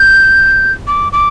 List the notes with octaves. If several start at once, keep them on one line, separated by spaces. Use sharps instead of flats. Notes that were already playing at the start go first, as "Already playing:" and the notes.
Already playing: G6
D6
D6